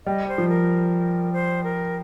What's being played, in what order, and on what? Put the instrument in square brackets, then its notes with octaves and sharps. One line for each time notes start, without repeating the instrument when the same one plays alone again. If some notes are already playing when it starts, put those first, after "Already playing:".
[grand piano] G3 [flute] D#5
[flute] C5
[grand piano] F3
[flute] A#4
C5
A#4